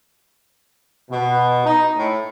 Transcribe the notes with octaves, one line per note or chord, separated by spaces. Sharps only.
B2
D#4
A2